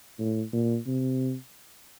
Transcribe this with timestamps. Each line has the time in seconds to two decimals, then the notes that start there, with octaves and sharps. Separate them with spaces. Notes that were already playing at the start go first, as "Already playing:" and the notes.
0.19 A2
0.53 A#2
0.87 C3